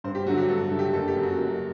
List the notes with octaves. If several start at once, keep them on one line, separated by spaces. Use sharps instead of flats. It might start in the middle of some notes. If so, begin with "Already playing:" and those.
G2 C5
G4
D3 F#3 A3 F#4
G4
G2 A4
A4
D3 F#3 A3
G4
F#1 A4
G4
F#2 F#3
F#4
F#1